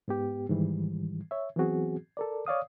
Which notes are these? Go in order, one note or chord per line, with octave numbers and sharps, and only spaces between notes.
G#2 B3 G4
G#2 D#3 E3 G3
C#5 E5
E3 F#3 B3 C4 F#4 G#4
A4 A#4 D5
C#5 D5 F5 D#6